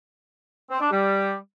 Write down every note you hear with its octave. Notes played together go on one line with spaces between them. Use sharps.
C4
D4
G3